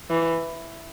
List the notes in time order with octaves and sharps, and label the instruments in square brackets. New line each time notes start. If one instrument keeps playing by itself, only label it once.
[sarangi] E3